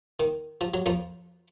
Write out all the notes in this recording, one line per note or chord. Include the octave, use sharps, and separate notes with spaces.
D#3
F3
F#3
F2 F3